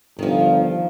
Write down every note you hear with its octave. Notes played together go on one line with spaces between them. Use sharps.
G1 D#3 F3